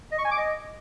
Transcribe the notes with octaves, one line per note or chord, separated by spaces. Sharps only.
D#5
C#6
G#5
D6
D#5